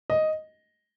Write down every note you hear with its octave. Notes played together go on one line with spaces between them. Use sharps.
D#5